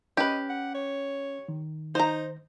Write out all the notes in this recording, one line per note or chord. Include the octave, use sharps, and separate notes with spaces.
C#4 G4 B4 D#5
F#5
C#5
D#3
D#4 C5 A#5